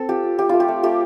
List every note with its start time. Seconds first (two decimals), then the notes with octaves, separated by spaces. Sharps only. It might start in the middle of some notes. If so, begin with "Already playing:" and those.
Already playing: C4 A4
0.09 F4 G4
0.23 F4
0.39 A3 G4
0.49 A3 F4
0.60 G4
0.68 A3
0.83 A3 G4